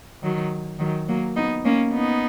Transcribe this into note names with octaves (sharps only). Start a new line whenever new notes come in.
D#3 F#3
D#3 F#3
F#3 A#3
B3 D#4
A#3 C#4
B3 D#4